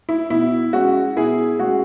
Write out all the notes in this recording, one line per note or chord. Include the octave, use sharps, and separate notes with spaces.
E4
B2 E4
G#3 C#4 F#4
B2 E4 G#4
G#3 C#4 F#4